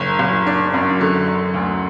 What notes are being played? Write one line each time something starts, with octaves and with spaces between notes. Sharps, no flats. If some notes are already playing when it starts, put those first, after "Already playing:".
Already playing: F#1
F#1
D4
F#2
D3
D3
D2